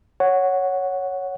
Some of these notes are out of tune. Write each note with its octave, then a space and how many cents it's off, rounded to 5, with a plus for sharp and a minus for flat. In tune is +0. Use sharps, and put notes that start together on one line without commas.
C#5 +0 F#5 +0